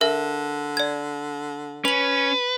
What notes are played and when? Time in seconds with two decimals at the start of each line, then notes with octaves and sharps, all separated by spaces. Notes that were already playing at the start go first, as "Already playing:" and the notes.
0.01 D3 A#4 E5
0.77 D5 G#6
1.85 C#4 B4 F7 F#7